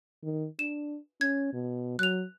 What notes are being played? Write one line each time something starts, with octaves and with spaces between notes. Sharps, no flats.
D#3
D4 E7
C#4 G#6
B2
F#3 F#6 F7